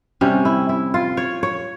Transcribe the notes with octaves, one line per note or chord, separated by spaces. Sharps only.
C3 G3 C#4
E4
E4
F4
C#5
C#5